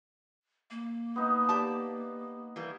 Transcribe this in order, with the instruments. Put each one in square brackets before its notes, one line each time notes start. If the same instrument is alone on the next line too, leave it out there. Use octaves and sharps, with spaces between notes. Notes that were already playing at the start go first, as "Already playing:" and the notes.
[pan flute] A#3
[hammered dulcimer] B3 D#4
[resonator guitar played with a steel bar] G4 D5 A5
E3 G3 A#3